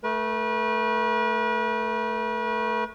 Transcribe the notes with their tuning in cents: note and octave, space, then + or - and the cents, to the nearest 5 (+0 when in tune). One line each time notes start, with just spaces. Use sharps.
A3 +0 B4 -35